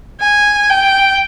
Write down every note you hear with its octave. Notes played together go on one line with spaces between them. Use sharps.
G#5
G5